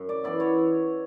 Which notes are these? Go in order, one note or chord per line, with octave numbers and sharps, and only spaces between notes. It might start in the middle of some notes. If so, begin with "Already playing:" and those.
Already playing: F#2
D5
E3 B3 E4 D5
C#5